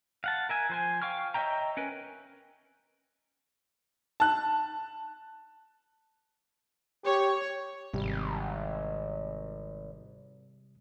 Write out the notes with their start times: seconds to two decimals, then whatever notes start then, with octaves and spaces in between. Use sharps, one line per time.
0.24 F5 F#5 A5
0.49 A#4 E5 G#5
0.70 F3 C5 G#5
1.02 F5 G5 C#6 F6
1.34 C#5 D#5 E5 G5 A#5
1.77 C#4 A#4 B4
4.20 A5 F#6
7.04 G4 C#5
7.94 G#1 C3 G3